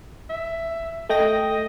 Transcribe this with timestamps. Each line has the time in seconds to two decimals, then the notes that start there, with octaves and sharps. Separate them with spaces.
0.30 E5
1.09 A3 D#5 G5 A#6